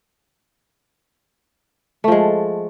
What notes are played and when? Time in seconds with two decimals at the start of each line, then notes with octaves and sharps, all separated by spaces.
2.04 A3
2.08 F3
2.12 G#3